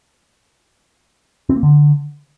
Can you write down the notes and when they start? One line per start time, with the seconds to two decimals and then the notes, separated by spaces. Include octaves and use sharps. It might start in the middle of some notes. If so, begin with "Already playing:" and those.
1.49 C4
1.56 A#3
1.63 D3